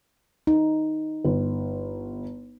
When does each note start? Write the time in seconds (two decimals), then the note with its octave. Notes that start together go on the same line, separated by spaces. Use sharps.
0.47 D#4
1.25 G1